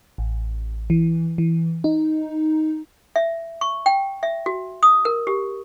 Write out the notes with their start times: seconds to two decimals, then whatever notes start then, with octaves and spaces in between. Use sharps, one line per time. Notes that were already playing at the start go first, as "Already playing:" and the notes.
0.18 A1
0.90 E3
1.38 E3
1.84 D#4
3.16 E5
3.61 C#6
3.86 G5
4.23 E5
4.46 F#4
4.83 D#6
5.05 A#4
5.27 G4